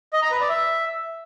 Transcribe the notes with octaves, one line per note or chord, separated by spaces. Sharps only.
D#5
A#5
B4
D5
E5